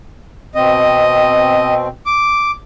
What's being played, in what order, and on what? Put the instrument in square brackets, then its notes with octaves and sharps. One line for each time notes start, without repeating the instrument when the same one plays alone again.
[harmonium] B2 C4 [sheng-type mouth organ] D#5
[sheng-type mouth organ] D6